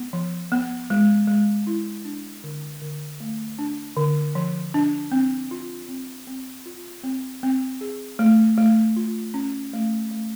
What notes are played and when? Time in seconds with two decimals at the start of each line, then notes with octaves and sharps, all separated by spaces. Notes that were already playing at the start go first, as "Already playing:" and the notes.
Already playing: B3
0.13 F3
0.52 B3
0.90 G#3
1.28 G#3
1.67 E4
2.05 D4
2.44 D3
2.81 D3
3.20 A3
3.59 D4
3.97 D3
4.35 F3
4.74 D4
5.12 C4
5.51 F4
5.89 C4
6.27 C4
6.66 F4
7.04 C4
7.43 C4
7.81 G#4
8.19 A3
8.57 A3
8.96 F4
9.34 C#4
9.73 A3
10.11 A3